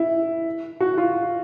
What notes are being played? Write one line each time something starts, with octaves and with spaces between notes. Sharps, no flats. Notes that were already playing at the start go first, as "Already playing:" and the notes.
Already playing: E4
F#4
F4